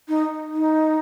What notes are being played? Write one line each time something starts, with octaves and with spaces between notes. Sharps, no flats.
D#4
D#4